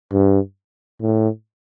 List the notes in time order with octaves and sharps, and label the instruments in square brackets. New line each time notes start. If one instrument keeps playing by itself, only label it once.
[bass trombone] G2
A2